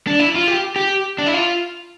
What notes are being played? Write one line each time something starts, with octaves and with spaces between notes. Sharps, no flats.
D4
E4
F4
G4
G4
D4
E4
F4